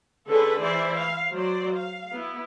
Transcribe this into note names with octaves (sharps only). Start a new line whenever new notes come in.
D3 C#4 G#4 A4 B4
E3 E4 C5 D5
F5
F#3 C5 D5
F5
B3 E4